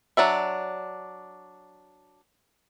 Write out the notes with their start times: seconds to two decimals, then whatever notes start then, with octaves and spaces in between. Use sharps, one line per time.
0.17 F#3 D4 D5 E5